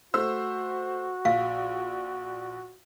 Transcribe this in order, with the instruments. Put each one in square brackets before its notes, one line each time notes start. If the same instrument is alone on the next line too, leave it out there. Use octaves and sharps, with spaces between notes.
[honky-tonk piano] A3 C5 E6 [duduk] F#4
[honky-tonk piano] A#1 [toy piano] F5